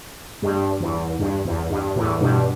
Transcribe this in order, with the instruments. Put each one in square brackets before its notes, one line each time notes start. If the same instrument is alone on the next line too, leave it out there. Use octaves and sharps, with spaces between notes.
[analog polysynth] G2
E2
G2
E2
G2
E2 A2
G2 B2